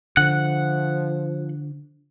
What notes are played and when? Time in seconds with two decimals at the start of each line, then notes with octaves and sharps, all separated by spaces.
0.17 D3 F3 F#5